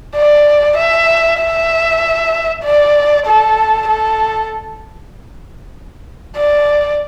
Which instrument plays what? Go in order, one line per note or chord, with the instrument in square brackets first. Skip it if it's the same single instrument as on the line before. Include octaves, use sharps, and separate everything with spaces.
[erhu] D5
E5
E5
D5
A4
A4
D5